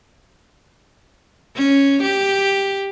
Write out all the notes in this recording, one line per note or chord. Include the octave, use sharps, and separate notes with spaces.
C#4
G4